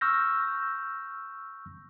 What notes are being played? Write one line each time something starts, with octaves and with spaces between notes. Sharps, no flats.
C#6 E6 F6 G6 A#6